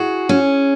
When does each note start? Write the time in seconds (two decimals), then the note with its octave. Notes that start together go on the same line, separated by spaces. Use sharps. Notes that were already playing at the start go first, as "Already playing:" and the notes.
Already playing: E4 F#4 G#4
0.29 C#4